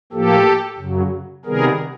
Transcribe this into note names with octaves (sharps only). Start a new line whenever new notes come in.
A2 F3 A#3 G4 A4
F#2 C#3 F#3
C3 D#3 G3 B3 G#4 A#4